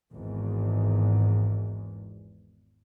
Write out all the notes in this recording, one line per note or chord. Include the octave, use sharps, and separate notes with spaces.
G#1 E2 G#2